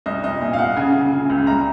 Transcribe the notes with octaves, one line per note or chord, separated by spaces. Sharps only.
C2 D#5
C2 D#5
A#2
F5
C2 F#5
C#3 G#5
C#3
C#3
C#2
C2 A#5